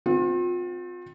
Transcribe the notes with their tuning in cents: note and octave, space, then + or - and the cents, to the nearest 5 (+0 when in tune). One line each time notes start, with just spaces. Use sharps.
C4 -20 F4 +35